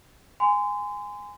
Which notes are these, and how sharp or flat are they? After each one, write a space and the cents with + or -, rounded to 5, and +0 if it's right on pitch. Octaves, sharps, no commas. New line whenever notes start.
G#5 -10 C6 -30